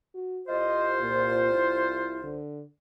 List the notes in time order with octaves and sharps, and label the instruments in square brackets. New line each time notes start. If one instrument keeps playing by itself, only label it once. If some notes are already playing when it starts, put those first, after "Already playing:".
[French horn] F#4
[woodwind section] C2 F4 C5 [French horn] D#5
[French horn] A#2
E4
D3